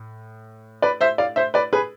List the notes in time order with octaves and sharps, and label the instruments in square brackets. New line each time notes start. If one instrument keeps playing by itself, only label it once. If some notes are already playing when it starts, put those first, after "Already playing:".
Already playing: [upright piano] A2
B4 D5
C5 E5
D5 F5
C5 E5
B4 D5
G#4 B4